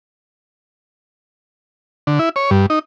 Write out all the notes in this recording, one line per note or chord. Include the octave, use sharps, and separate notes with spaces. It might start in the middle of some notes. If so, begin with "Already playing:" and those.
D3
E4
C#5
G2
D#4